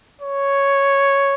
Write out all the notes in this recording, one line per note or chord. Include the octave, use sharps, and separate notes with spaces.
C#5